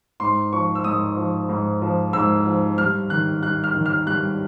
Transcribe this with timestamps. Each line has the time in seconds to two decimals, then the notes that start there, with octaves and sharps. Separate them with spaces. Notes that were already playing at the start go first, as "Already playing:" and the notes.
0.20 G#2 C6
0.53 F3 C#6
0.75 E6
0.84 G#2 D#6
1.17 F3
1.49 G#2
1.82 F3
2.13 G#2 E6
2.46 F3
2.78 G2 F6
3.10 D#3 F#6
3.42 G2 F#6
3.64 F6
3.74 D#3
3.86 F6
4.07 G2 F#6